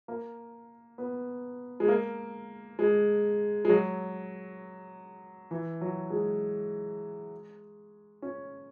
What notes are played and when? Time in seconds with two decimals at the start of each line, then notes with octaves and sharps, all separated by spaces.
0.08 A#3
0.98 B3
1.80 G#3
1.88 A#3
2.79 G#3
3.65 G#3
3.69 F#3
5.51 E3
5.81 F#3
6.10 G#3
8.22 C#4